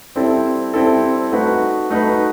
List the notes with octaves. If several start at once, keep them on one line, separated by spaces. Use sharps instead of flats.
G3 C4 E4 A4
G3 C4 E4 A4
A3 D#4 F#4 B4
A3 D#4 F#4 B4